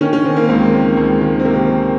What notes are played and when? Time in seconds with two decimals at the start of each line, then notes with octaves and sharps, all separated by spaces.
0.01 D#3 C#4
0.13 C#4
0.25 D#3 C4
0.37 A#3
0.49 C#2 C4
0.73 D#3
0.97 C#2
1.21 D#3
1.40 C4
1.45 C3 A#3